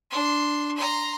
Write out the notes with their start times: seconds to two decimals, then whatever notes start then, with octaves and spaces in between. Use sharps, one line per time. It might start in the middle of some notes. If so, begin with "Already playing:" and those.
0.11 D4 C6
0.77 A#5 C6